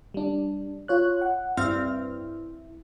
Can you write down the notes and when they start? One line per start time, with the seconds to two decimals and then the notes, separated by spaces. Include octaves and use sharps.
0.14 G3 D4
0.88 F4 C#5 F#6
1.22 F#5
1.57 G2 C4 E4 F6